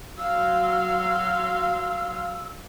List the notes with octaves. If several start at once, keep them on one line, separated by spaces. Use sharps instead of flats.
F#3 F5 C6 E6